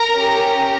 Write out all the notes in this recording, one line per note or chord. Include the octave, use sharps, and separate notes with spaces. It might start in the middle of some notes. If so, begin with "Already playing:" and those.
Already playing: A#4 A#5
C#4 G4